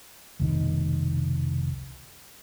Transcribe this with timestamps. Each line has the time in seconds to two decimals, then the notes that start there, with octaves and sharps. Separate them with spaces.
0.39 F1 C2 B2 D#3